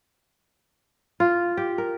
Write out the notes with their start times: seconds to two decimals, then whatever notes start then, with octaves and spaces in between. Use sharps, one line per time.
1.20 F4
1.57 G4
1.78 A#4